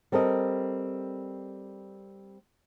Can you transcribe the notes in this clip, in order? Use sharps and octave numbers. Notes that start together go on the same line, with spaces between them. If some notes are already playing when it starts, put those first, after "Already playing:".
G3 C4 A4 A#4 D#5